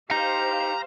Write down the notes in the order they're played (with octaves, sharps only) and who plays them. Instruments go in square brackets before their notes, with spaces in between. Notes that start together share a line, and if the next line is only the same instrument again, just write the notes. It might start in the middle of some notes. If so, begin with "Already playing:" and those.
[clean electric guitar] D#4 [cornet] G4 [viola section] C5 F5 [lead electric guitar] A#5